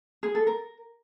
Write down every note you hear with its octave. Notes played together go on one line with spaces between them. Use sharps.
G#4
A4
A#4